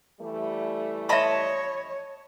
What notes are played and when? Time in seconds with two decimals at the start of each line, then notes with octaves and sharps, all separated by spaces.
0.20 E3 G3 A3
1.09 C#5 D#5 E5 A5 B5 C6